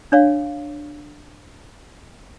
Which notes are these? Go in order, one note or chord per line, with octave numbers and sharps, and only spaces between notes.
D4 C#5 F5